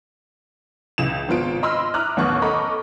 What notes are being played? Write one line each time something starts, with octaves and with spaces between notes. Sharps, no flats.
C#2 E3 D#6 E7
G#1 B3 F4 D7
D#5 B5 C6 E6 F6
E4 A#5 D6 D#6 F6 F#6
A1 D#2 B3 C#6 F#6
A4 D#5 A#5 B5 C#6 D6